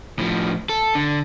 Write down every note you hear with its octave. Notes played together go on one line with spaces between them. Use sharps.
A2 F3
A4
D3